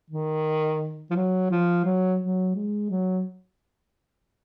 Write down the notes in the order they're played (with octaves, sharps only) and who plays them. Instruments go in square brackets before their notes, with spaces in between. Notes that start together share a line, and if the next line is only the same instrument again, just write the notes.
[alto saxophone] D#3
F3
F#3
F3
F#3
F#3
G#3
F#3